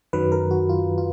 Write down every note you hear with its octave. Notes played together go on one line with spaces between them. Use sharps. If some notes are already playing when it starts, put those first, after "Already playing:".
F#2 D#3 F#3 B4
A#4
F#4
F4
F4